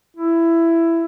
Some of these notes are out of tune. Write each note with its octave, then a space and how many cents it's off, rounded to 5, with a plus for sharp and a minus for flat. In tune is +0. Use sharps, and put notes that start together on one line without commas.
E4 +15